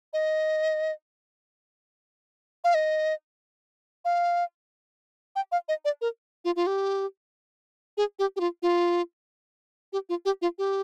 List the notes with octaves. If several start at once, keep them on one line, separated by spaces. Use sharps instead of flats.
D#5
F5
D#5
F5
G5
F5
D#5
D5
A#4
F4
F4
G4
G#4
G4
G4
F4
F4
G4
F4
G4
F4
G4